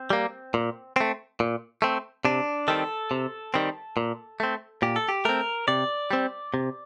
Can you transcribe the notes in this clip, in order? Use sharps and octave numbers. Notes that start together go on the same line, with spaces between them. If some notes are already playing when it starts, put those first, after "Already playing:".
Already playing: C4
G3 A#3
A#2
A3 C4
A#2
A3 C4
C3 D4
D#3 G3 C4 A4
C3
D#3 G3 C4
A#2
A3 C4
A#2 G4
A4
G4
A3 C4 A#4
C3 D5
G3 C4
C3